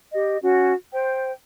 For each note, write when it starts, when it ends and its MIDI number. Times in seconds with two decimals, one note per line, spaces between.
0.13 0.38 67
0.13 0.38 75
0.42 0.72 61
0.42 0.72 66
0.92 1.31 72
0.92 1.31 79